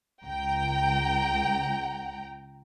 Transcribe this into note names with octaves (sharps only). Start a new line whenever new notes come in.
C#2 G5 A#5